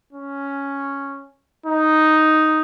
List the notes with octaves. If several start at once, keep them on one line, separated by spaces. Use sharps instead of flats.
C#4
D#4